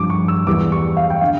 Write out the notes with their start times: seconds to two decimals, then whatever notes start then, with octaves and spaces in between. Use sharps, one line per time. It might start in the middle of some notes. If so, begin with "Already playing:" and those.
Already playing: G2 F3 D6
0.10 C#6
0.28 E6
0.47 E2 E3 G3 D6
0.72 C#6
0.97 F5
1.10 G5
1.21 D3 F5